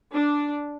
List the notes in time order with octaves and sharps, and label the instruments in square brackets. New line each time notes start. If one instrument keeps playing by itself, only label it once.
[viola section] D4